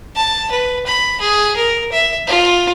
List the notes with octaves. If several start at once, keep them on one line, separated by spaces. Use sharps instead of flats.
A5
B4
B5
G#4
A#4
E5
F4